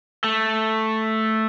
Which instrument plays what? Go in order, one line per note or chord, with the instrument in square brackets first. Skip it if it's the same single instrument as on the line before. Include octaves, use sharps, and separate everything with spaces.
[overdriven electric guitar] A3